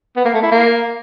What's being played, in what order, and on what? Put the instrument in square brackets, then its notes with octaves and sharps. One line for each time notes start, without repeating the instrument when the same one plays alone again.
[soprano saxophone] B3
A#3
A3
E4
A#3